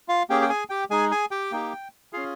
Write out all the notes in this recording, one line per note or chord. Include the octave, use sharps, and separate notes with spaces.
F4 F5
A#3 C#4 G4 G#4 G5
G5
G#4 G#5
G4 G5
G#3 D#4 G#4 G#5
G#4 G#5
G4 G5
A#3 D#4 G4
C#4 F4 G#4 F5